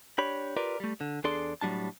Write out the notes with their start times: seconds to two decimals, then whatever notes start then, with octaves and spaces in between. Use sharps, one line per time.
0.18 D4 G4 C#5 B5
0.57 F4 G4 A#4 B4 D5
0.80 G3 A3
1.01 D3
1.24 E2 D4 G#4 A4 D5 C6
1.61 A2 F#3 G3 D4 A5